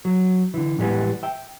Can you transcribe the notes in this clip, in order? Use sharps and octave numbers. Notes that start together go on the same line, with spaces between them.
F#3
D3 E3
A2 E3 G3 G#3 B3
E5 G5